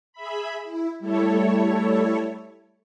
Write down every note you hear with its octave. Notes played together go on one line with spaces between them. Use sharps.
G#4 E5 B5
E4
G3 A3 E4 A4 C#5